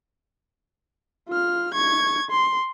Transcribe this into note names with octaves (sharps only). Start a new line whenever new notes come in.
F4 F6
C#6 G#6
C6